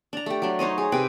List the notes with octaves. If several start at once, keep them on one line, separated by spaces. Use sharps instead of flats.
D4 A#5
A3 G4
F#3 D4
D#4 C5 C#5 D#5
G#4
C3 B4 G5